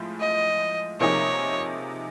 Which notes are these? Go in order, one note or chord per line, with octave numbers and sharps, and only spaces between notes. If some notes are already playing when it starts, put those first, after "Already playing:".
Already playing: A2 F3 G#3
D#5
C3 F3 A#3 D#4 G#4 C#5